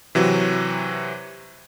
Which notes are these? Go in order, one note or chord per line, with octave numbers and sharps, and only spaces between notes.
C3 E3 F#3 F#4